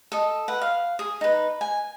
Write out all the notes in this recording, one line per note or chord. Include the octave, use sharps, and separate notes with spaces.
A4 D#5
B4 F#5
F5
G#4
D#4 B4
G#5